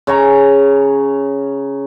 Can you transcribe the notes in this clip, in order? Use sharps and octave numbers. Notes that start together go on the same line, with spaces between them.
C#3 C#5 A#5